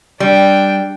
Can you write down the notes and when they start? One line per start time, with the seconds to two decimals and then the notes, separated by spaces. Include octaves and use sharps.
0.20 G3 D4 G5